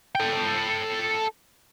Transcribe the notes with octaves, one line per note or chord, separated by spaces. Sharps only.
A4 G5